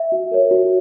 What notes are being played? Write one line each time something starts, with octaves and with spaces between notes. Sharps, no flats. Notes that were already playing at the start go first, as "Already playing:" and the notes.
Already playing: E5
F#4
A#4 C#5
F#4